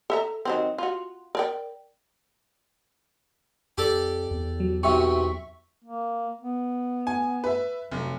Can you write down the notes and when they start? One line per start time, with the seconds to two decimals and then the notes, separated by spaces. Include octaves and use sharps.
0.10 A4 E5 A#5
0.45 D#3 F#3 C4
0.78 F4 F#4
1.35 A#4 D5 G5
3.78 F2 G4 A4 D5
4.31 E2
4.60 F#3
4.83 B1 C3 E5 C#6
5.84 A#3
6.41 B3
7.07 G#5
7.44 B4 E5
7.91 F1 F#3